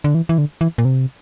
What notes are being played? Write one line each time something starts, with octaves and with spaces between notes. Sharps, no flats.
D3
E3
E3
D3
E3
A#2
C3